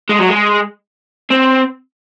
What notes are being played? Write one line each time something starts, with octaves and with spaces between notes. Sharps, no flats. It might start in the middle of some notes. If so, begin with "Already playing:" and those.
G#3
F#3
G#3
C4